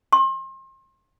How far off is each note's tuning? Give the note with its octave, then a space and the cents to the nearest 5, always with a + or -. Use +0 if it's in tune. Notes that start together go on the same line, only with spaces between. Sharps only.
C6 +35